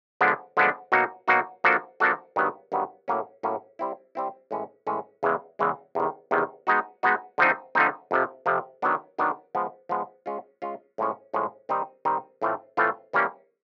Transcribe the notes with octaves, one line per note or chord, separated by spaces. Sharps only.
D3 F3 G#3 B3 D4
D3 F3 G#3 B3 D4
B2 F#3 A#3 D#4 F#4
B2 F#3 A#3 D#4 F#4
F3 A#3 D4 F#4 A4
F3 A#3 D4 F#4 A4
G2 D#3 F#3 B3
G2 D#3 F#3 B3
A2 F#3 A#3 C#4
A2 F#3 A#3 C#4
G3 C4 E4
G3 C4 E4
A2 E3 G#3 C#4
A2 E3 G#3 C#4
E2 C#3 E3 G#3
E2 C#3 E3 G#3
E2 C3 D#3
E2 C3 D#3
G#3 B3 D#4 F#4
G#3 B3 D#4 F#4
D3 F3 A3 C4 D#4
D3 F3 A3 C4 D#4
F2 C3 F3
F2 C3 F3
D#3 F#3 B3 D4
D#3 F#3 B3 D4
F3 G#3 B3
F3 G#3 B3
G#3 C#4 F4
G#3 C#4 F4
A2 F3 G#3 C#4
A2 F3 G#3 C#4
D#3 G3 C4 D#4
D#3 G3 C4 D#4
A2 E3 A3 C4 F4
A2 E3 A3 C4 F4
E3 G3 A#3 C#4